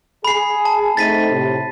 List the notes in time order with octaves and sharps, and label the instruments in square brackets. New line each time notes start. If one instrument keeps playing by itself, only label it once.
[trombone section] G#4 [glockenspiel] B5 C7
[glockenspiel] A5
[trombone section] A3 C4 D#4 [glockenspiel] A6 B6 D#7
[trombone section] A2 C3